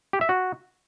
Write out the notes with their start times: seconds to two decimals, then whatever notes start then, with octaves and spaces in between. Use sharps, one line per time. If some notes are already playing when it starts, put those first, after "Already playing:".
0.13 G4
0.21 E5
0.29 F#4